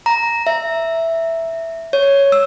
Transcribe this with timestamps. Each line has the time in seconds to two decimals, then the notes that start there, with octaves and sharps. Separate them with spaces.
0.06 A#5
0.47 E5
1.93 C#5
2.32 E6